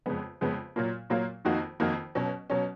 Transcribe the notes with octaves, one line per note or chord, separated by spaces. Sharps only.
F2 C#3 G#3 B3
F2 C#3 G#3 B3
A#2 F#3 A#3 F4
A#2 F#3 A#3 F4
F2 D#3 A#3 D#4 F#4
F2 D#3 A#3 D#4 F#4
B2 F#3 C#4
B2 F#3 C#4